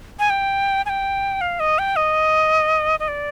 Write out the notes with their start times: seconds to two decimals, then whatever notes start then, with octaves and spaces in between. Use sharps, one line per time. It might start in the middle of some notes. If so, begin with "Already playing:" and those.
0.19 G#5
0.30 G5
0.86 G#5
0.89 G5
1.41 F5
1.60 D#5
1.79 G5
1.96 D#5
3.00 D#5
3.08 D5